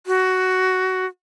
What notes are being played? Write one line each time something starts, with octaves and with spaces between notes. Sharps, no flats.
F#4